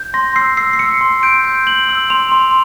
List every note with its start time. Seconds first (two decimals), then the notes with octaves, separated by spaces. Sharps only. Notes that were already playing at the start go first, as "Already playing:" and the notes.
Already playing: G6
0.14 C6 A#6
0.36 E6 C7
0.57 E6 C7
0.73 C7
0.79 E6 C#7
1.01 C6
1.23 G6 D7
1.45 G6
1.67 G6 F#7
1.89 E6
2.10 C6 F7
2.32 C6